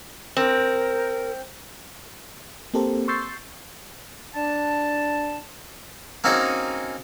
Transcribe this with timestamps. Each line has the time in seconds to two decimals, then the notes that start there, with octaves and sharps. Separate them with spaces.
0.37 C4 A#4
2.74 A#3 C4 G4 A4 A#4 C5
3.08 C6 C#6 E6 G6 A6 C7
4.34 D4 A5
6.24 A#3 C4 C#4 D#4 F#4 G#4